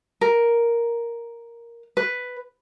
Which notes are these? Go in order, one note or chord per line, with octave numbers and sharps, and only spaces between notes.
A#4
B4